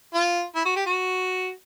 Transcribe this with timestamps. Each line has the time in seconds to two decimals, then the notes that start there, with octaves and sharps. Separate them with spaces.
0.14 F4
0.55 E4
0.65 F#4
0.76 G4
0.86 F#4